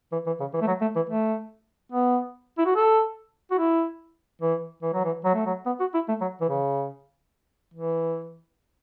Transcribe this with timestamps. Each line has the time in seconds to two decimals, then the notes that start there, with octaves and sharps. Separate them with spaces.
0.12 E3
0.26 E3
0.40 C#3
0.54 E3
0.61 A3
0.67 F#3
0.81 A3
0.96 E3
1.10 A3
1.92 B3
2.58 E4
2.66 F#4
2.76 A4
3.51 F#4
3.58 E4
4.42 E3
4.83 E3
4.94 F#3
5.05 E3
5.25 F#3
5.35 A3
5.46 F#3
5.66 B3
5.80 F#4
5.94 E4
6.08 A3
6.21 F#3
6.41 E3
6.49 C#3
7.74 E3